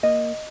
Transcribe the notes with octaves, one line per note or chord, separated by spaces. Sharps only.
A#3 D#5